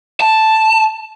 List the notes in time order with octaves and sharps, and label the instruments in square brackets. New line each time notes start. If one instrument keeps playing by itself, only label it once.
[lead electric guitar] A5